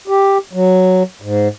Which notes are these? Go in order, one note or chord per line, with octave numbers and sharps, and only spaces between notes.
G4
F#3
G#2